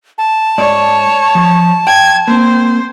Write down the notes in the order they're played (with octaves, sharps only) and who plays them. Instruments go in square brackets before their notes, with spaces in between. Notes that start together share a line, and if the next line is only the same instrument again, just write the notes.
[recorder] A5
[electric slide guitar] G#2 D5 [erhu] C#5
[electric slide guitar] F3
[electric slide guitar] G5 [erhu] G#6
[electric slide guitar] A#3 C4 [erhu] C5